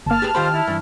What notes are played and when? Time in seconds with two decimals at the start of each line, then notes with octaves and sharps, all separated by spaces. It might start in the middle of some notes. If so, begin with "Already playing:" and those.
0.06 G1 A#3 A5 F6
0.22 G4 G#4 B4
0.35 D#3 F4 G4 C5 B5
0.53 E4
0.68 G2 E3